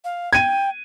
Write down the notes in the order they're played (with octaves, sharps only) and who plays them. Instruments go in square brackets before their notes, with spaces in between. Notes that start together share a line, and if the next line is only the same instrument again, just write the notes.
[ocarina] F5
[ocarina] G5 [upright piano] G#6 D#7